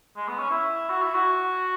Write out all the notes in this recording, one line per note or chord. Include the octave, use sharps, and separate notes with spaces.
G#3
B3
C#4
E4
F#4
E4
F#4